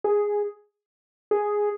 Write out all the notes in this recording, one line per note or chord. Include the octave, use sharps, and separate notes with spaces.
G#4
G#4